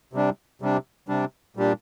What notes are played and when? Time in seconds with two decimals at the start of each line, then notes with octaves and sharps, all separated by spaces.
0.13 C3 G3 D4
0.62 C3 G3 D4
1.08 C3 G3 D4
1.56 A#2 G3 D4 G4